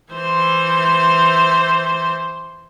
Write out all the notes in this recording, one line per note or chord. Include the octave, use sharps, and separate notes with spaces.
E3 C5